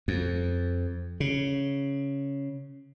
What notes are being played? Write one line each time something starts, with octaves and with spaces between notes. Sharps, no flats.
F2
C#3